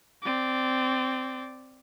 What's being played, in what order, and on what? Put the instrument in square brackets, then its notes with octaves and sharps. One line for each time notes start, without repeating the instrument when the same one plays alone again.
[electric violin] C4 D5